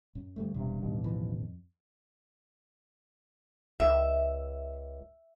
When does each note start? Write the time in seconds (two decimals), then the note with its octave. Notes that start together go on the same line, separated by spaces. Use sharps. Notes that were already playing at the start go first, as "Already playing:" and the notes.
0.15 F#2
0.36 D2 G2 A3
0.54 E1 G2 C3
0.82 A1 D#2 B2
1.04 E3 F3
1.31 F2
3.80 C#2 E5